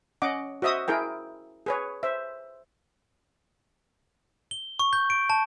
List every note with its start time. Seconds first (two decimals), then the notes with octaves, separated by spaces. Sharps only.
0.22 C#4 D#5 F#5 D6
0.62 F#4 C5 D#5 E5 D#6
0.88 E4 G#4 A#4 G5
1.66 G#4 B4 C#5
2.03 C5 E5
4.51 G7
4.79 C#6
4.93 G6
5.10 D7
5.30 A5